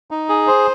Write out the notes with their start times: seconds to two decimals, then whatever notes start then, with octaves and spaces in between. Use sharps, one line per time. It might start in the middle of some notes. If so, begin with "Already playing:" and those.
0.11 D#4
0.29 G#4
0.47 C5